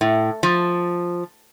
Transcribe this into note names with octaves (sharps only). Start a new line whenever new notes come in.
A2
F3